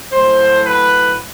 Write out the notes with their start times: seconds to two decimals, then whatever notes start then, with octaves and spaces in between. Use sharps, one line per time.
0.12 A2 F#3 C5
0.64 B4